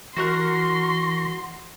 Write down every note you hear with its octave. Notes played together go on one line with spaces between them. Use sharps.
E3 F#4 A#4 F#5 C6 C#6 A#6